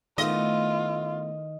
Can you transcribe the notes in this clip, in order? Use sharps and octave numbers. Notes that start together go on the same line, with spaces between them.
D#3 A3 B3 E4 F4 D#5